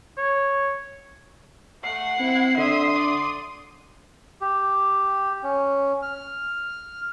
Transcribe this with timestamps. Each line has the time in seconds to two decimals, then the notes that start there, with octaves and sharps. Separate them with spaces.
0.17 C#5
1.84 A3 F#5 C7
2.19 C4 E4
2.57 D3 E5 C6 D#6
2.95 D5
4.41 G4
5.43 C#4
6.02 F6